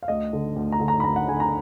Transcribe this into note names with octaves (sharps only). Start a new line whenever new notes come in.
F5
D2 D#5
D3
D2
A#5
D3
A#5
B5
D2 A#5
F#5
D3 G#5
A#5